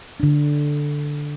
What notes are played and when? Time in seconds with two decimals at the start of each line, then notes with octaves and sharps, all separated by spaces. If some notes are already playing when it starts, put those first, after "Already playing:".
0.20 D3 D4